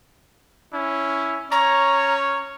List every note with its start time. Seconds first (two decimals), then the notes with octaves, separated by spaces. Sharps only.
0.73 C#4 E4
1.52 C#4 C#5 A#5